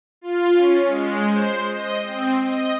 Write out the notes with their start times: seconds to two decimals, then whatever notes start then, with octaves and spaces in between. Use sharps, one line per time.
0.21 F4
0.53 C#4
0.86 G#3
1.25 C5
1.71 D#5
2.03 C4
2.46 D#5